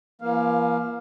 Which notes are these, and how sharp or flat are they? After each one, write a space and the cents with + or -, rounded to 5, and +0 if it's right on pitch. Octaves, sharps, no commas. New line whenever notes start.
E3 +45 A#3 +30 F5 +0